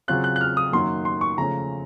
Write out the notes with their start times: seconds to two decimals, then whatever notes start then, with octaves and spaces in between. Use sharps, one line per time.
0.08 C#3 F#3 C4 F4 F#6
0.24 F#6
0.36 F#6
0.41 F6
0.57 D#6
0.72 F#2 D#3 F#3 A#3 C6
1.05 C6
1.21 C#6
1.38 C#3 F3 A3 C#4 A#5